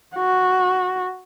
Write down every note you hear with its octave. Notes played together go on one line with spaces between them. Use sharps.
F#4